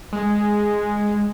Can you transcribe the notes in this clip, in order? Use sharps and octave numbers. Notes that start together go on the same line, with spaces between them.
G#3